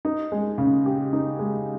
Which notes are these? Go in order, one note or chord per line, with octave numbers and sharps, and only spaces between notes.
D#4
G#3
C#3
G4
D#4
G#3